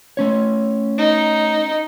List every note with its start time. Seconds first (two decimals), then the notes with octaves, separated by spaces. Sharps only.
0.17 A3 C#4 C#5
0.98 D#4